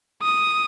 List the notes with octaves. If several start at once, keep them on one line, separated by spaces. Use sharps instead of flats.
D#6